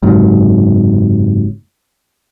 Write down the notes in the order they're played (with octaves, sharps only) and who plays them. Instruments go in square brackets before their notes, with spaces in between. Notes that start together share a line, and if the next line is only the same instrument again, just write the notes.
[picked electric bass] F#1 G#2 C3 F#3